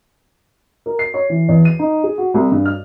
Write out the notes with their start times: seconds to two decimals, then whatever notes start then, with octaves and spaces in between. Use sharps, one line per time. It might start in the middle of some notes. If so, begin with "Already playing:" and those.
0.86 A#4
0.99 C7
1.14 C#5
1.29 E3
1.48 E2
1.65 D#7
1.79 D#4
2.04 G#4
2.18 F#4
2.34 C2
2.51 G2
2.65 F6